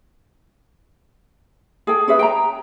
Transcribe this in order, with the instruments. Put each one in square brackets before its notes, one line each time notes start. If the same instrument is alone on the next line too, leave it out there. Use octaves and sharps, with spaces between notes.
[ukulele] G#4 A4 G5
C#4 G#4 B4 E5
G5 A#5